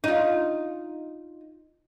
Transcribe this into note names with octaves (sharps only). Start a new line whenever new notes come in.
D#4 F4